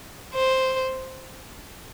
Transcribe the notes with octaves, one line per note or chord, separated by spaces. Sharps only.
C5